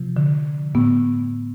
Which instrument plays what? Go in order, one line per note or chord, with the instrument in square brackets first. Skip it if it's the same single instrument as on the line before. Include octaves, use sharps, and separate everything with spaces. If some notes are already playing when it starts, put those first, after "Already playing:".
Already playing: [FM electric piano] C3 F3
[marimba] D3
[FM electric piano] A2 [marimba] B3